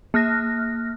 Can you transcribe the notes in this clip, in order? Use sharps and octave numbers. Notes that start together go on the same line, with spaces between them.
A#3 F6 F#6 A#6